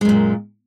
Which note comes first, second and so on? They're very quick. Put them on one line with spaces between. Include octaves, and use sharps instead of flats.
G#3 F#2 A#2